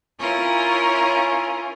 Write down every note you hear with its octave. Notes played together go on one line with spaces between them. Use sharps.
C#4 E4 F4 A#4